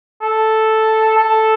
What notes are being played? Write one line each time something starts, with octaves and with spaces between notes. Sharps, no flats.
A4
A4